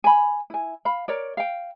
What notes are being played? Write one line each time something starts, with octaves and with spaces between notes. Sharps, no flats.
G#5 B5
E4 G#5
F5 B5
A#4 C#5 D5
F5 G5